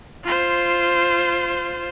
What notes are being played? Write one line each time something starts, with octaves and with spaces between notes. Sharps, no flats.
F4 C5